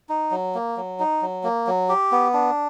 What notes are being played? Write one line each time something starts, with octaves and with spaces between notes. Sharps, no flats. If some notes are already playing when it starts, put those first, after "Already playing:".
D#4
F#3
A#3
F#3
D#4
F#3
A#3
F#3
G4
B3
D4